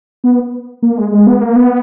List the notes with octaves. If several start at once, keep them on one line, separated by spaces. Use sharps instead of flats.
B3
A#3
G#3
G#3
B3
A#3
B3